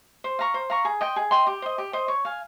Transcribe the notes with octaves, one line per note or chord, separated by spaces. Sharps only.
C5
F5 A#5 C#6
C5
F5 A#5 C#6
G#4
D#5 G5 C6
G#4
D#5 G5 C6
G4
C5 D#5
G4
C5 D#5
C#5
F5 G#5